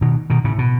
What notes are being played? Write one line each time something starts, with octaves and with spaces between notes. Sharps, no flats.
B2 D#3
B2 D#3
A2 C#3
B2